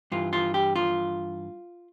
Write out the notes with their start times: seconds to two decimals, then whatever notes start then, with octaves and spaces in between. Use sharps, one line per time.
0.12 G2 E3 F4
0.33 F4
0.54 G4
0.76 F4